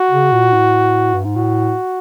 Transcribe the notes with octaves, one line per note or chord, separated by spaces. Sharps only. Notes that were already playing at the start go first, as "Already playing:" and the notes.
Already playing: F#4
C#3
A#2
A2
G2
G#2
A2 F#4